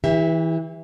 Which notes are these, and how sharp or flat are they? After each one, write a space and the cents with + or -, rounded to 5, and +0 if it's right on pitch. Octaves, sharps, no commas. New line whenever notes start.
E3 -20 G4 +30 E5 +0